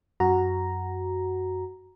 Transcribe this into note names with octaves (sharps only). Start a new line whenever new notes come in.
F#2 F#4 A#5